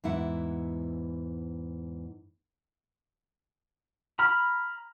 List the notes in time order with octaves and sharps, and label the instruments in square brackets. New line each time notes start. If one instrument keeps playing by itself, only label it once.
[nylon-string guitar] E2 G#2 E4 F#5
[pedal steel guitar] A#5 B5 F6